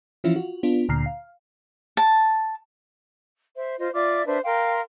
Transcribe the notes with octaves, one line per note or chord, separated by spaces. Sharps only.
E3 F3 C#4 E4 F4
F4 F#4
B3 D4 F4
D2 A#2 D3 A#5 F6 C7
F5
A5
C5 E5
F4 C5 D#5
F4 D5 E5 D6
D4 B4 C5 E5
A#4 F5 G5 C6